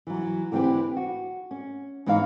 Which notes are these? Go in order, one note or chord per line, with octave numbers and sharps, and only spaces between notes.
E3 F#3
D3 E3 C4 F#4 G4 B4
F#4
C#4
G#2 E3 B3 D#4 C#5 F5